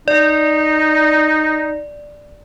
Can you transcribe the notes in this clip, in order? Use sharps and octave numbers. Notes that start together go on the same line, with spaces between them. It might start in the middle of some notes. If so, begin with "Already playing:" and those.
D#4 D5